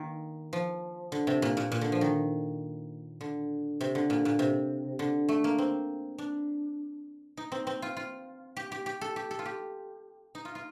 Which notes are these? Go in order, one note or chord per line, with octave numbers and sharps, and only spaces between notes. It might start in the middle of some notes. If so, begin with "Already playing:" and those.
Already playing: D#3 A#3
F3
D3
C3
A#2
A#2
A#2
D3
F3
D#3
D3
C3
D3
A#2
A#2
C3
D3
A3
A#3
C4
D4
D#4
C4
C4
F4
F4
G4
G4
G4
A4
G4
A4
F4
G4
D#4
F4
F4